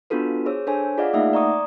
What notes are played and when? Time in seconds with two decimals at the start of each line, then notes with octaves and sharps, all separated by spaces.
0.10 B3 D4 F4 F#4 A4 B4
0.46 G#4 C5 C#5 E6
0.67 D4 A4 C5 C#5 G#5
0.98 F4 G#4 D5 D#5 F5 F#5
1.13 A3 A#3 D#4 E5 F#5
1.33 D5 A#5 C#6 D#6